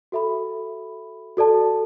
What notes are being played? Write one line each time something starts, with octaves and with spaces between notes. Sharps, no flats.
F#4 A4 E5 B5
F#4 A4 D5 A5